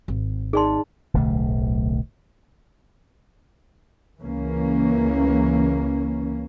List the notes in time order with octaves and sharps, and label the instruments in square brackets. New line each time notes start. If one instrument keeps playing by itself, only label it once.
[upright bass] G#1
[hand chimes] D#4 A5 [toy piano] G#4 D5 C6
[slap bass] D1 B1 D3 A3
[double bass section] C#2 E3 A#3 C#4